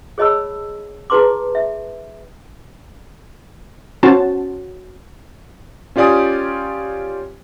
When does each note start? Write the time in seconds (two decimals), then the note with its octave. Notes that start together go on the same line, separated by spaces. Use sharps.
0.18 G#4 C#5 D#5 A5 B5 E6
1.10 E4 G#4 B4 A5 C6 D6
1.55 E5
4.03 C#4 F#4 C5 A5
5.96 C#4 F4 G4 D5 G#5 D#6